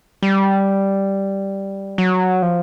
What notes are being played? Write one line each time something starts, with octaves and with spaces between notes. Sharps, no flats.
G3
F#3
F3